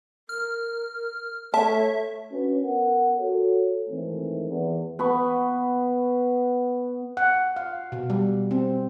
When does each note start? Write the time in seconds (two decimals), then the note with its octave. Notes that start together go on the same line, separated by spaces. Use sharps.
0.29 A#4 F6
1.54 A3 C#5 E5 A5
2.32 C#4 D4 F#4 B4
2.63 B3 A#4 F#5
3.16 F#4 A4 C#5
3.89 G#2 D#3 E3 A3 C4
4.48 E2
4.99 B3 B5 C#6
7.17 F#5
7.56 F5
7.92 B2
8.10 G3
8.51 C4